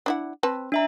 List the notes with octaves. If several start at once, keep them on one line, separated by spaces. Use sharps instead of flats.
D4 E4 F#5
C4 B4 A5
D4 E5 A#5